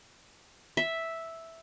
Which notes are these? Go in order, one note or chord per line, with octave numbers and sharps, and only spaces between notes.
E5